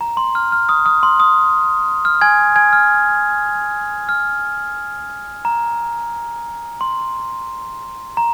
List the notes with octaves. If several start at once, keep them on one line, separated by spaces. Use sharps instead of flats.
A#5
C6
F6
F6
D#6
D#6
C6
D#6
F6
G#5 G#6
G#5 G#6
F6
F6
A#5
C6
A#5